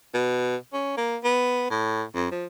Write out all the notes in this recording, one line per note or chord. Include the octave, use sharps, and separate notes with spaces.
B2
C#4
A#3
B3
A2
F2
F3